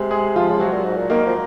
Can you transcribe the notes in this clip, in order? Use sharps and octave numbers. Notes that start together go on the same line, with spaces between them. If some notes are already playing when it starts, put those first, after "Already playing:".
Already playing: C3 G#3 G#4
G#3 G#4
F3 F4
C#3
C3 F#3 F#4
A#2
G#2
A#2
D#3 A#3 A#4
F3